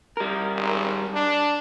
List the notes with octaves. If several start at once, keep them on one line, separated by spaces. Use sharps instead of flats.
G3 A#4
G#1
D4